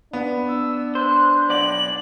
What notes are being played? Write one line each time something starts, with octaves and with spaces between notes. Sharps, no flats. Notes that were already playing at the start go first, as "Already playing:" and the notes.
B3 D4
E6
C5 F#6
B1 D5 F#7